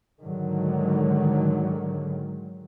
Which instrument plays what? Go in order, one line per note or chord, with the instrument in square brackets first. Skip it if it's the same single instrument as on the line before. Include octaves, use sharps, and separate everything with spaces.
[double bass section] G#2 D3 D#3 F#3